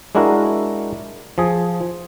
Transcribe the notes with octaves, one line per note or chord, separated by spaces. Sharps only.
G#3 D4 E4 F#4 A#4
F3 G#4